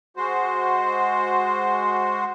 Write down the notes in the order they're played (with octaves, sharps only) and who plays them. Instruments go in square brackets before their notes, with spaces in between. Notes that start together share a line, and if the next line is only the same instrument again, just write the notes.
[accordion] G#3 F#4 C5